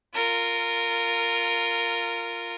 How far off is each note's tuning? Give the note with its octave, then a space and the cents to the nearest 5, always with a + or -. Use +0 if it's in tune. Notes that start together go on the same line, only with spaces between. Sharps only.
F4 +0 A#4 -15